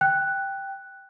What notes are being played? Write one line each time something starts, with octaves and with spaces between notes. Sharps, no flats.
G5 F#6